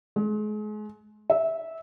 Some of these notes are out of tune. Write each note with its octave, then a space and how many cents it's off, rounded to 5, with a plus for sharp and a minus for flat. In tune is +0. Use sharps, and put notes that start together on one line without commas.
G#3 +35
E5 -15